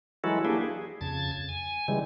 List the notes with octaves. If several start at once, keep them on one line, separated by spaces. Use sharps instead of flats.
E3 F#3 G#3 E4 F#4 A4
A#3 D4 E4 G4 G#4
G#4
F2 C#3 A5 G#6 A6
G#5
C#3 E3 G3 G#3